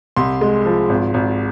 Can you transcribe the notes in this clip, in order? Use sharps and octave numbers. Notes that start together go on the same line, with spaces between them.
C2 C6
G#3
F3
G#1
G#1